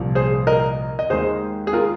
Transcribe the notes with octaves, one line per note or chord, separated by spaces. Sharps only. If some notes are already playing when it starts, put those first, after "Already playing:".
Already playing: C2 A#2 F3
G#4 C5
A#4 D#5
D#5
D#2 D#3 G#3 G#4 C5
G#4
F4 A#4